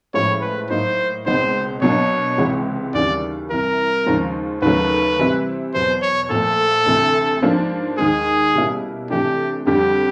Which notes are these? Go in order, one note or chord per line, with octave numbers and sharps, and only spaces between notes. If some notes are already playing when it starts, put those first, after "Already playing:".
A2 F3 G#3 C#4 C#5
B4
A2 F#3 A#3 D#4 C5
C#2 B2 G#3 C4 D#4 C5
B2 F#3 A#3 D4 C#5
C#2 C3 E3 G#3
D#2 C#3 E3 G3 D5
C2 C3 E3 A#4
D#2 C#3 F3 G#3
D#2 C#3 F#3 A3 B4
C3 E3 G3 C4 E4
E2 B2 F#3 B3 C5
C#5
A#2 F3 A3 A4
D2 C3 E3 A3
G#2 F3 A#3 D4
D#2 D#3 G#3 G#4
B2 G3 A#3 C#4 E4
C3 E3 A3 D4 G4
F2 D3 G3 G4